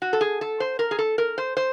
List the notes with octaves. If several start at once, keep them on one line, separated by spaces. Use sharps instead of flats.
F#4
A4
G#4
A4
C5
A#4
G#4
A4
A#4
C5
C5